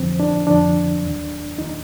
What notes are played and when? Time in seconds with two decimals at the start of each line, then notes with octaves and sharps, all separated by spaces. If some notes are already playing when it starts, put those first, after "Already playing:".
Already playing: F2 D3 F3 C4
0.20 D4
0.46 F2 D3 F3 D4
1.02 D#2 D#3 F#3
1.58 D#3 F#3 D#4